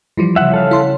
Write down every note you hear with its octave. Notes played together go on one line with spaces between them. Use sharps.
E3 F3 G3
C#3 F#3 E5 F#5
A4 F5
E4 C6